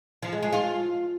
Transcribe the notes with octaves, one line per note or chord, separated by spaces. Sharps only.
F3
G#3
G#3
F4